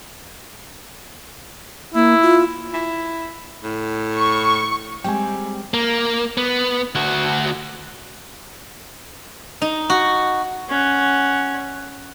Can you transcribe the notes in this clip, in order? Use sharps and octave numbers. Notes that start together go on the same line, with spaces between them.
A#3 E4
F4
E4
A2
C#6
G3 G#3 C4 G5 G#5
A#3
B3
D2 F#4
D#4
F#4
C#4 F#5